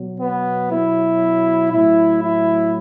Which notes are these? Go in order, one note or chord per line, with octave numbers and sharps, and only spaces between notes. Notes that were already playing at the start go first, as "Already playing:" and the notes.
Already playing: B2 F#3
B3
E4
A2 F#3 E4
E4